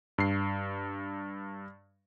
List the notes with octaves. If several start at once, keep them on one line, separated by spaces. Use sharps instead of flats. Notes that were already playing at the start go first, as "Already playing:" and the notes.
G2 C7